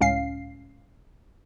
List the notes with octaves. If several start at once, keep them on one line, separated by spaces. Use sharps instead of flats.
C#2 A2 C#4 F5 C7